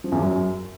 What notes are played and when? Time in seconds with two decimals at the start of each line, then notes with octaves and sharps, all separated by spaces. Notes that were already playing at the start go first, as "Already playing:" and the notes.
0.04 F3
0.12 E2
0.20 F#2